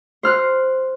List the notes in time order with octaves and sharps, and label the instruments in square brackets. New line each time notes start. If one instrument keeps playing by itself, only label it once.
[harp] C5 F6 F#6